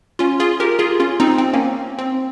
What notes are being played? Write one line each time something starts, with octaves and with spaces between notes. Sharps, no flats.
C#4 F4
F4 G#4
G4 A#4
F4 G#4
C#4 F4
C4 D#4
C4
A#3 C#4
C4